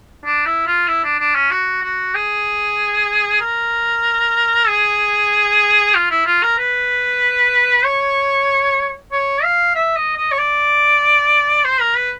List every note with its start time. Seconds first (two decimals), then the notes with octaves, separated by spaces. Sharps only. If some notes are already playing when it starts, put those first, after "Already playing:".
0.25 D4
0.46 E4
0.67 F4
0.88 E4
1.04 D4
1.19 D4
1.35 C#4
1.51 F#4
1.83 F#4
2.14 G#4
3.41 A#4
4.68 G#4
5.95 F4
6.10 E4
6.26 F4
6.43 A#4
6.58 B4
7.85 C#5
9.12 C#5
9.43 F5
9.75 E5
9.96 D#5
10.17 D#5
10.31 C#5
10.38 D5
11.65 C5
11.81 A#4
11.97 B4